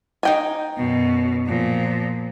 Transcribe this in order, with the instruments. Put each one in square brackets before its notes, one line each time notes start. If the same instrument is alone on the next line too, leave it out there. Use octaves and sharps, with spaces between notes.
[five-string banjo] D#4 G5 G#5
[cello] F#2 B2
A#2 F3